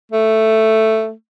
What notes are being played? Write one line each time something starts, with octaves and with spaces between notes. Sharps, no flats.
A3